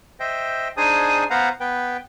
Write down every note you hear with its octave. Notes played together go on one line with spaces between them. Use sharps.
C5 D#5 E5 G5
D4 D#4 G#4 C5 G#5 D#6
B3 B4 C5 F5 F#5 A#5
B3 B4 G5